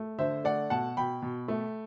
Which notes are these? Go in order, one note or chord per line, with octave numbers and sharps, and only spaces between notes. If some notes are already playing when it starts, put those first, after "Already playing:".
Already playing: A3
D3 C5 E5
A3 D5 F#5
B2 F#5 A5
B2 G5 B5
B2
A3